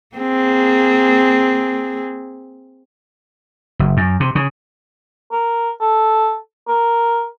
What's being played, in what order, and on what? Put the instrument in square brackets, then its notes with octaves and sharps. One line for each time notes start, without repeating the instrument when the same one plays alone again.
[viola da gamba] A#3 C4 G#4
[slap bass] F#1
F#2
C3
C#3
[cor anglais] A#4
A4
A#4